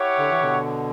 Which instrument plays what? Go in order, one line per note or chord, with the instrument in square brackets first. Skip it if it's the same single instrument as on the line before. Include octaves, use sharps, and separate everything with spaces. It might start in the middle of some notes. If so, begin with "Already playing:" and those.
Already playing: [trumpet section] E4 G4 C#5 F#5
[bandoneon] D3
E3
B2 D3